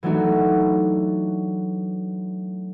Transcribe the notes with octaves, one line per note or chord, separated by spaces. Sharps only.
E3 F#3 A3 D4 D#4 F#4